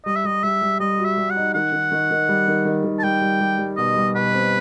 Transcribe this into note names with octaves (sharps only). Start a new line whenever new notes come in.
G3 D#5
E5
G3 D#5
G3 E5
G3
G3 D#5
F#4
E5
G3
F#5
D#4
D#3 F#5
D#3
D#3
D#3
G3
D#3
D#3
D#3
A5
G3 G5
G3
G3
G3
B2 D#5
G3
B2 B4
C4